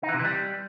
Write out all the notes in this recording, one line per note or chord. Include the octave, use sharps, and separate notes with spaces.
D#4
E3
C3
E3
G3